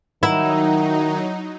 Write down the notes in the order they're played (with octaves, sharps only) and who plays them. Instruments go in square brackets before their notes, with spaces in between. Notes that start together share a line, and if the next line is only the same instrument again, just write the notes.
[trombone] D#3 [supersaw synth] F#3 D#4 [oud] E4 [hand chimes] F#5 A#5